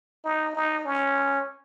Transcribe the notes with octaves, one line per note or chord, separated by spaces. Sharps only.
D#4
D#4
C#4